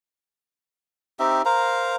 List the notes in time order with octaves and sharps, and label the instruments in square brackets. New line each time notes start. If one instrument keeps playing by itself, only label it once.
[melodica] C4 D#4 G4 E5
A#4 C5 F5 A#5